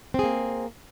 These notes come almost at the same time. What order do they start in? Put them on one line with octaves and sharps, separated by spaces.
C4 G#4 A#3